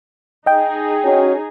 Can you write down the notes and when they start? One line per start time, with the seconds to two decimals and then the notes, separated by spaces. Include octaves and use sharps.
0.46 D#4 G#4 D#5 G5
1.03 C#4 F#4